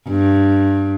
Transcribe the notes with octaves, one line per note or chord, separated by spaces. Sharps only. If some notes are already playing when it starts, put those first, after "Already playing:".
G2